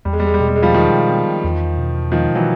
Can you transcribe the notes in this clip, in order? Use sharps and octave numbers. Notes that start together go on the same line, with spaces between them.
E2 G3
G#3
G3
G#3
G3
B2 G#3
G3
G#3
F3 G3
D#3 F3 G#3
B3
E2
B2
D#3 F3 G#3
E3 F#3